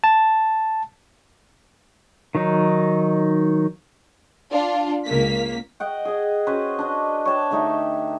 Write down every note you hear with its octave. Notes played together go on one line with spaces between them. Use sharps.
A5
D#3 F#3 D#4
D4 F4
C#2 A#3 B6
D#5 F#5 G5
G#4 D#5
C#4 F#4 B4 C5
D4 D#5
C#5 G5 A5
D3 A3 D#4 G4